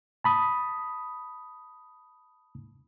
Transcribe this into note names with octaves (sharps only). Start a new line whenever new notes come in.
A5 B5 D#6